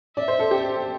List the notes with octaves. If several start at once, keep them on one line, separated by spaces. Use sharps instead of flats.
D5 E5
C5
A4
G4